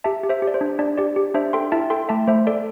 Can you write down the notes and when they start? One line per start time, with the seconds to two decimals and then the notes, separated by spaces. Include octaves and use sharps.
0.04 G4 E5 A5
0.23 G4
0.29 C5 E5
0.42 G4
0.47 D5
0.54 C5
0.61 D4
0.79 D4 D5
0.98 G4 D5
1.16 G4
1.34 D4 C5 E5
1.53 A4 G5 C6
1.72 E4 E5 A5
1.90 A4 G5 C6
2.09 A3 E5 A5
2.27 A3 C5 E5
2.47 A4 D5